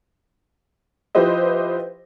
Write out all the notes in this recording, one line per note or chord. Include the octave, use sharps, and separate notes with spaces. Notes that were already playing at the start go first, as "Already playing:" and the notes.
F3 E4 G4 B4 C5 D#5